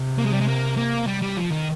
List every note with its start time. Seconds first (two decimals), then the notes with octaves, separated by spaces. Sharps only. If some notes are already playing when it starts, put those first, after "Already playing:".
Already playing: C3
0.18 A#3
0.25 G#3
0.33 G3
0.40 G#3
0.48 A#3
0.77 A#3
1.07 G3
1.22 G3
1.37 F3
1.52 D#3